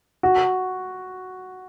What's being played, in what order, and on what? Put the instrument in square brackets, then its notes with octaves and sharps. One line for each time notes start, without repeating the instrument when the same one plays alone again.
[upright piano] F#4